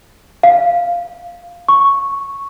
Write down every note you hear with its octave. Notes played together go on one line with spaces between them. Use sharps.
F5
C#6